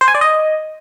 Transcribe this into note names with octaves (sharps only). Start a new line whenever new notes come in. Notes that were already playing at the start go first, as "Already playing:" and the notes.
C5
G#5
D5
D#5